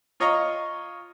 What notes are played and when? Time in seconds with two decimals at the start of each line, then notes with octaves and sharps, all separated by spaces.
0.20 F4 C#5 D#5 F5 A#5 C#6